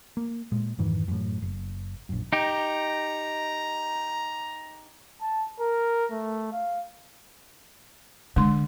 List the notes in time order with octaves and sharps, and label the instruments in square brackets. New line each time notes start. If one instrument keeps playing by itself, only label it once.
[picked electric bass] A#3
A#2 G#3
F2 G#2 D#3 E3
F#2 A2
F#1
A#1 F#2
[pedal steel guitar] D#4 G4 [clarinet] A#5
[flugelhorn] A5
A#4
A3
F5
[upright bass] D3 [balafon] G#3 C6